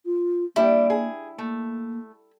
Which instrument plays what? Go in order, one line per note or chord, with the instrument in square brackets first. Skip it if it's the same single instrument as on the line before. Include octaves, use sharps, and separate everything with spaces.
[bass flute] F4
[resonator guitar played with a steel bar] G3 D4 G4 [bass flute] A#3 [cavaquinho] E4
[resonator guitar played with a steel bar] G#4
[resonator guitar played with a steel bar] A3 [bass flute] A#3